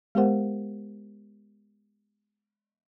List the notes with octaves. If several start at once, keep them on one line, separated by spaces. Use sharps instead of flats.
G#3 B3 G4 A#4 C5 F#5